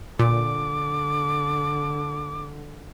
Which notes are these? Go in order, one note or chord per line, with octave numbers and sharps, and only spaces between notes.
A#2 D3 D6